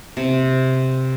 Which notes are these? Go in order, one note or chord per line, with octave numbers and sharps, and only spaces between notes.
C3